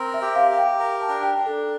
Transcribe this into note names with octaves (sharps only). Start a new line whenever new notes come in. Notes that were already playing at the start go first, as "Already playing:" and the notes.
Already playing: C4 A#4
E5
G4
F5
G4
G5
A#4
A5
D4
G5
D4
A4